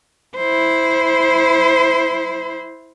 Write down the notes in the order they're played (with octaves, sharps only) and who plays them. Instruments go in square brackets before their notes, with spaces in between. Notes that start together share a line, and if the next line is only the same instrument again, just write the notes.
[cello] E4 C5